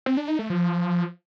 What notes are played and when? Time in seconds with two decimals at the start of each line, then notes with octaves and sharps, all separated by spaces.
0.06 C4
0.17 D4
0.28 D#4
0.39 A3
0.50 F3